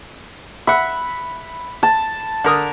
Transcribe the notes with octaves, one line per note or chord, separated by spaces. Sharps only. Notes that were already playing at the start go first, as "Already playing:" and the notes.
E5 F#5 B5
A5
D3 A#4 D#6